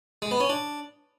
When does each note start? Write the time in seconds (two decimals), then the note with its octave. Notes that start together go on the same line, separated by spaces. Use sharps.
0.22 G#3
0.31 B3
0.40 C#4
0.49 D4